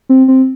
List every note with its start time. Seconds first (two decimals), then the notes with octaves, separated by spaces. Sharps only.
0.09 C4
0.28 C4